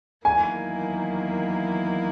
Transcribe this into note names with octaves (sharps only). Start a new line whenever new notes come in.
E2 D#3 F#3 A#3 E4 G#5